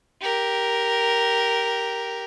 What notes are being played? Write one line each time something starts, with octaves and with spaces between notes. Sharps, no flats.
G4 A#4